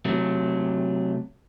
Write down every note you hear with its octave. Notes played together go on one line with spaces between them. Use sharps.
C3 F#3 A3